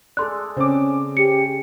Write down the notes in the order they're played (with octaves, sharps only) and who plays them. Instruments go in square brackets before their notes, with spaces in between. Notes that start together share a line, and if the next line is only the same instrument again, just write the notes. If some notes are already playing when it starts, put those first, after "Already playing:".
[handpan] G#4 A4 D5 [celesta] C6 F#6
[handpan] C#3 [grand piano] C4 D6 [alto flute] C#4
[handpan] C#4 [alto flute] G4 [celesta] C#7